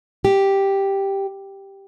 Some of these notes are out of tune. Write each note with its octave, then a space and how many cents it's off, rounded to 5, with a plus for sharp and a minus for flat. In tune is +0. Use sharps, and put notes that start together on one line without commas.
G4 +0